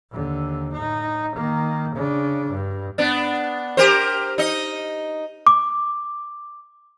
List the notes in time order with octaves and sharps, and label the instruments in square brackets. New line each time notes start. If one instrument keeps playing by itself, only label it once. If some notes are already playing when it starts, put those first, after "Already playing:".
[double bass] D#2 D3
A2 D#4
D#3 A#3
C#3 D4
G2
[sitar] B3 D4
G4 A#4 C5
D#4 D#5
[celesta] D6